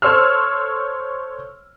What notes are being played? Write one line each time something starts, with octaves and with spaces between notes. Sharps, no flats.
A4 C5 C#5 C6 E6 F6